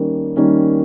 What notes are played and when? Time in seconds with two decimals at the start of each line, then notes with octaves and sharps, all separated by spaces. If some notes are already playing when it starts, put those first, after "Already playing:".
Already playing: D#3 G3 A#3 C#4
0.37 D#3 G3 A#3 C#4